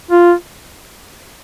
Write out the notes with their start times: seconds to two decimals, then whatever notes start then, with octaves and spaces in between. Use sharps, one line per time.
0.11 F4